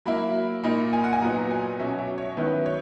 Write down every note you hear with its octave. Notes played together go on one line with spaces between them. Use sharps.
F#3 A#3 E4 B5
A#2 A#3 D#4 B5
G#5
F#5
G#5
A#2 F#3 B3 D#4 A#5
G#5
B2 F#3 C#4 E5
E5
C#5
D#3 F#3 B3 E4 B4
C#5